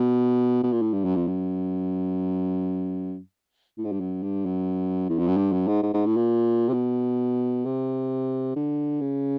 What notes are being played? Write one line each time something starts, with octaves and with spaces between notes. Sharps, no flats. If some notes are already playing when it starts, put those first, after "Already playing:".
Already playing: B2
B2
A#2
A2
G2
F#2
F2
F#2
A2
G#2
G2
F#2
G2
F#2
E2
F2
F#2
G2
F#2
G#2
G#2
G#2
A2
A#2
C3
B2
C3
D3
C#3